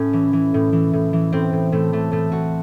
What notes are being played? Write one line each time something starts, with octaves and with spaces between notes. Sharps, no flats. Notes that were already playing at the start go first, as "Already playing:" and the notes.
Already playing: A2 C#4
E3
E3
A2
E3
A2
E3
A2 C4
A2
A2 A3
E3 A3
A2 A3
A2 F#4